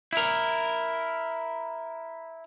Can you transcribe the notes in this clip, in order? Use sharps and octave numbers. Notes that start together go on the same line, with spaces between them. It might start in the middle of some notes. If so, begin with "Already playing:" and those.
E4 A#4